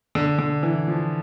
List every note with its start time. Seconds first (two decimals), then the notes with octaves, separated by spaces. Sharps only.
0.15 D3
0.39 D3
0.63 E3
0.88 F3